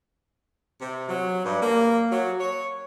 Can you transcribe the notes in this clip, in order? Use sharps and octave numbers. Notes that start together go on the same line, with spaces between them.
C3
F#3
G2
A#3
F#3
C#5